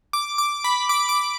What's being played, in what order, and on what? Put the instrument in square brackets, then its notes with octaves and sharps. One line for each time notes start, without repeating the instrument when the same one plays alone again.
[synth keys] D6
D6
B5
D6
D6